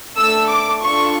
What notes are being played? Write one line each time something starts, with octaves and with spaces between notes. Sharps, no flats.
A3 D4 A4 E6
D6
D4 F4 A4 C#6